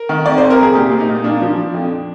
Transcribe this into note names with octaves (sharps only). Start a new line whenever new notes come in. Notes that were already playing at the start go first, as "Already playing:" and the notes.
Already playing: A#4
D#3
F2 D5
C3 C5
A#4
C3 G#4
A#2 G4
A#2
D#4
A#2
A#3 D4
F3
F3
F2